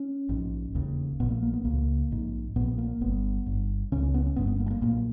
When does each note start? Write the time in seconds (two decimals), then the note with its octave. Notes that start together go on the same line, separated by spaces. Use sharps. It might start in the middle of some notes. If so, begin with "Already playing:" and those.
Already playing: C#4
0.29 A#1 G#2
0.74 E1 D#2 C#3
1.20 A#1 A#2 B3
1.31 A#3
1.42 A#3
1.53 B3
1.65 C#2 A#3
1.70 C#3
2.11 A#1 G#2
2.56 A#1 A#2 B3
2.78 A#3
3.01 G1 G2 B3
3.46 G1 G2
3.92 C#2 C#3 C#4
4.03 C#4
4.14 B3
4.26 C#4
4.36 G1 G2 B3
4.47 B3
4.60 A#3
4.66 G#3
4.71 A#3
4.81 B1 A#2 A#3